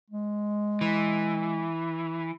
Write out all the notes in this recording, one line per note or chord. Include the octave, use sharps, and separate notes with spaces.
G#3
E3